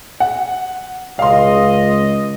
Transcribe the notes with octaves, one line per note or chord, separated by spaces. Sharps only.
F#5
C#2 D#5 F5 C6